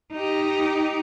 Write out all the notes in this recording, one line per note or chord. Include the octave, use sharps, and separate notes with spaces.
D#4 G4